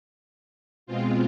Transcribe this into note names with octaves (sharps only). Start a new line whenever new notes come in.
B2 G#3 C4 F4